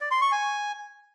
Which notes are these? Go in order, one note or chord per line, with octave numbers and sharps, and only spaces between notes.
D5
C6
C#6
G#5